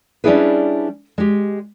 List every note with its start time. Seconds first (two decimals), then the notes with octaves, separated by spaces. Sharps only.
0.24 G3 C#4 D4 E4 G#4 B4
1.18 G#3 G4